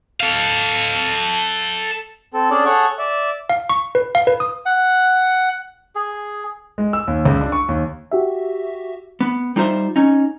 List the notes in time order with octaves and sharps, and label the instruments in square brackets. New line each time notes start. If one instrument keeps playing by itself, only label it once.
[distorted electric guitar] A4 F5
[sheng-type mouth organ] C4 A4
C#4 D4 G#4 A4 D5
G#4 A4 C#5 F#5 C#6
D5 E5
[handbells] F5
C#6
B4
F5
B4
D#6
[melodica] F#5
G#4
[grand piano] G#3
E6
D#2
C#2
D4
C#6
D#2
[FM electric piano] F#4 G4 E5
[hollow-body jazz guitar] B3
G3 D#4 F4 C5 E5
C#4 D#4